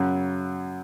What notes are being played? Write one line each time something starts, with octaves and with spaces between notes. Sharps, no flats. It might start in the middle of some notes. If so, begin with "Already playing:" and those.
Already playing: F#2 C#3 F#3